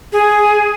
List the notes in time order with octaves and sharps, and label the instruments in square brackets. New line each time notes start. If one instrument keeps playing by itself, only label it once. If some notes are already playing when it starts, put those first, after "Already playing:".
[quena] G#4